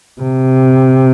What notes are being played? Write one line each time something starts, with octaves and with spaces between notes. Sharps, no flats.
C3